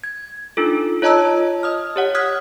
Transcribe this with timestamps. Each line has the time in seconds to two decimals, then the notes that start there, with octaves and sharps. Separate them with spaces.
0.04 G#6
0.57 D4 D#4 F4 A4
1.02 F4 C#5 D#5 A5 A#5 E6
1.63 D#5 D#6 F6
1.96 G4 C#5 F#5
2.15 D#6 F6 F#6 G#6 B6